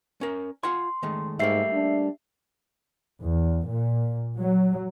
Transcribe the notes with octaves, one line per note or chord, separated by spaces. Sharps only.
C#4 A#4
F4 F#5 G#5 C6
D#3 G#3 A3
G#2 G3 A3 A#3 E5 C7
D4
E2
A#2
F#3